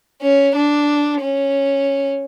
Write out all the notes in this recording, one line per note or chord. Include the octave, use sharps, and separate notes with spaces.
C#4
D4
C#4